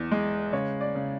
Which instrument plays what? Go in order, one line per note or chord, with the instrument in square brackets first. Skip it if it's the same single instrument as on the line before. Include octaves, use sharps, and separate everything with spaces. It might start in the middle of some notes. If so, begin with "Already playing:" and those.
Already playing: [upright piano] E2
G#3
C#3 C#5
D5
C#3